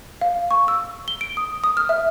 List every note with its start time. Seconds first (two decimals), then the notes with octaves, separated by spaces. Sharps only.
0.21 F5
0.51 C#6
0.68 E6
1.08 G7
1.21 D7
1.37 D#6
1.64 D#6
1.77 F6
1.89 E5